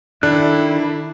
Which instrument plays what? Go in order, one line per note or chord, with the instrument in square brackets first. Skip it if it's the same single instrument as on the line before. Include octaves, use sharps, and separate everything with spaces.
[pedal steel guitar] D#3 A4 F#6 [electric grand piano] D4 [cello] E4